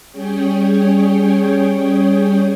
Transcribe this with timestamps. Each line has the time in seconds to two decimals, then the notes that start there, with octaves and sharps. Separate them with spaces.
0.12 G3 C#4 G#4 C#5 G5